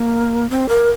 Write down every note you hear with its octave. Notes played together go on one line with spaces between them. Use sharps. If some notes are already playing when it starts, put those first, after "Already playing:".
Already playing: A#3
C4
A#4